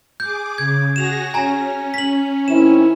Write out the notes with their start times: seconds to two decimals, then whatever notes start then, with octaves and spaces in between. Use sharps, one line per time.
0.20 G#4 D6 G6
0.58 C#3 G#6
0.96 F#4 G#4 A#6 E7 F7
1.34 C#4 G#5 A#5
1.94 B6 F#7
2.48 D#3 C4 E4 E7